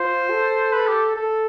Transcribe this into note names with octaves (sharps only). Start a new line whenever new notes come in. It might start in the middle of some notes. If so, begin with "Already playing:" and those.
Already playing: F4 C5
A4
B4
G4
A4